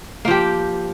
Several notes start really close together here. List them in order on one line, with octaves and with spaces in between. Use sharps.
A#3 F3 G4